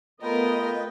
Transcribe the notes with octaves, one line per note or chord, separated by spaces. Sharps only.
A3 B3 F4 A#4 B4 D#5 G5